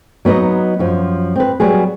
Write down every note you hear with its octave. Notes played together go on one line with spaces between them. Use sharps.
F#3 B3 D#4 B4 D#5
F#2 F3
C4 B4
F#3 G3 B3 G#4